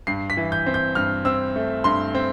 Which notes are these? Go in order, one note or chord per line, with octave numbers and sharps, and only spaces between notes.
G2 C7
B6
E3
G6
C4
G6
G2 F6
C4 E6
A3
G2 C6
C4